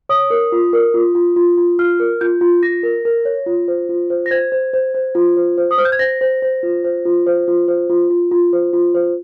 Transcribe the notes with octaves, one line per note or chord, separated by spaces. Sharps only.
C#5 D#6
A#4
F4
A#4
F4
F4
F4
F4
F4 F6
A#4
F4 G6
F4
F4 A#6
A#4
A#4
C#5
F4
C5
F4
C5
A#6
C5 G#6
C5
C5
C5
F4
C5
C5
D#6
C5 F6
G6
G#6
C5 A#6
C5
C5
F4
C5
F4
C5
F4
C5
F4
F4
F4
C5
F4
C5